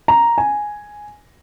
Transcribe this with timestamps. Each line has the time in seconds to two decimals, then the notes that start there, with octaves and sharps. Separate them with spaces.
0.08 A#5
0.38 G#5